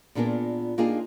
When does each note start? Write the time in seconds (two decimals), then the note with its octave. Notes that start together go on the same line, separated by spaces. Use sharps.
0.15 A#2 B3 D4 F4 G#4 A#4
0.78 A#3 D4 D#4 F4 G4 G#4